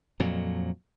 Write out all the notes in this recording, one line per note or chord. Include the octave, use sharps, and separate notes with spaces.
F2 A#2 F#3